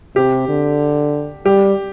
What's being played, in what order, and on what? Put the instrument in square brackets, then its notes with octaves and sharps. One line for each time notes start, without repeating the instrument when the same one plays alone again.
[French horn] C3 [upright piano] G4
[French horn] D3
[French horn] G3 [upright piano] G4